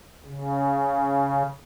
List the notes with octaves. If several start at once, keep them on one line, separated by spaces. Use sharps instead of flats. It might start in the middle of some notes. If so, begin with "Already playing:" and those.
C#3